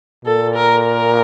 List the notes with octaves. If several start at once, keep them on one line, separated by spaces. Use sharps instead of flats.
A#2 A4
A#4
A#4